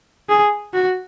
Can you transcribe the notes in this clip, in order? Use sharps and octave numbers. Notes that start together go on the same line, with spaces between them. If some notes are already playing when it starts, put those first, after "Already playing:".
G#4
F#4